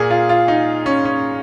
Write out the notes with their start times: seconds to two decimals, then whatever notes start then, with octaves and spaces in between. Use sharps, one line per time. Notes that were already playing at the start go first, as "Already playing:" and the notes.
Already playing: A#2 A#3 G#4
0.10 F4
0.29 F4
0.48 D#4
0.86 C#4
1.05 C#4